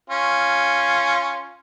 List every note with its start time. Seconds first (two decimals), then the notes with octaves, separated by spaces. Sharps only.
0.10 C#4 F4